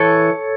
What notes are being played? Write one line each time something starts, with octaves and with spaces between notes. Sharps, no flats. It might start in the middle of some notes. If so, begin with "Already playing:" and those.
Already playing: E3 A4 C#5